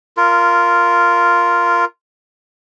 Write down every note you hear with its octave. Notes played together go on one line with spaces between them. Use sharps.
F4 A#4